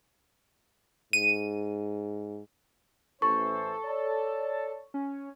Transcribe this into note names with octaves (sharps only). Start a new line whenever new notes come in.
G#2 D#7
A1 E3 A4 C5 C#6
C#5 D5 A5
C#4